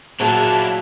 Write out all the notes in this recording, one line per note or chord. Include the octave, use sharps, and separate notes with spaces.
A#2 F#3 A#3 D4 E4 G#4 A5